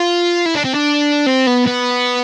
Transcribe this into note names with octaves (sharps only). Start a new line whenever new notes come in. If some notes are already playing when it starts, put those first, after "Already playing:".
Already playing: F4
E4
D4
C4
D4
C4
B3
B3